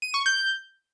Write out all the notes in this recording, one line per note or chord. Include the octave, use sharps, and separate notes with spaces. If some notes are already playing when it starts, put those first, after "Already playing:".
D#7
C#6
G6